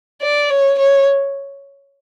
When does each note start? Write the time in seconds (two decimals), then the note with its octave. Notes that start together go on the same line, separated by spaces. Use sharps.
0.22 D5
0.50 C#5
0.79 C#5